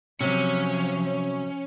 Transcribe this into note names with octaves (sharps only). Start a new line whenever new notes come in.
C3 F3 F#3 C#4